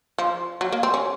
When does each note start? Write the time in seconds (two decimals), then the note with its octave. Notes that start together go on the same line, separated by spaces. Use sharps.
0.18 F3
0.61 F#3
0.72 A#3
0.83 C4
0.94 C#4